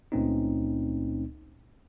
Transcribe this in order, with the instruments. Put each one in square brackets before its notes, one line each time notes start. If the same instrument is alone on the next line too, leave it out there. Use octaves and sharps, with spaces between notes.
[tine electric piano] C#2 A#2 A3 C4 C#4 D#4